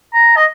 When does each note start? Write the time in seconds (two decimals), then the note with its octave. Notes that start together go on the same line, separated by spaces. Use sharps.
0.13 A#5
0.36 D#5